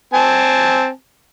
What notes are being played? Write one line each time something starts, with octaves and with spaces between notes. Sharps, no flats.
C4 G#5 A5